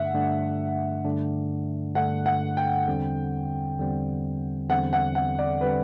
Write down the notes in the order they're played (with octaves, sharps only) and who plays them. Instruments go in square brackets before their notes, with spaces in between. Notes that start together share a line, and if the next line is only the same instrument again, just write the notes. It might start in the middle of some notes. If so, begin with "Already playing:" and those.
Already playing: [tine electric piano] G2 D3 A3 D4 [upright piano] E5 F#5
[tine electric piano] G2 D3 A3 D4
G2 D3 A3 D4
[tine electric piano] G2 D3 A3 D4 [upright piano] F#5
[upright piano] F#5
G5
[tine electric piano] E2 D3 G3 C4
E2 D3 G3 C4
[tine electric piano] E2 D3 G3 C4 [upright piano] F#5
[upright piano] F#5
F#5
D5
[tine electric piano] D3 G3 C4 [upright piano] B4